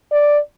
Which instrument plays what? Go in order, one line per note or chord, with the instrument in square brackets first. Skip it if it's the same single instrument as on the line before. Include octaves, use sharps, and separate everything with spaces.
[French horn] D5